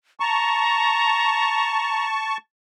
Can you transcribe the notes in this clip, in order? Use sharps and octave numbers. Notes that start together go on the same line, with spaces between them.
A5 A#5 C#6